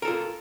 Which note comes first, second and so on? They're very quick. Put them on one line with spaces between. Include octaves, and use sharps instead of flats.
A#4 A4 F4